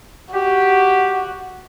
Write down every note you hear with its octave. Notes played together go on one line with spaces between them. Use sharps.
F#4 G4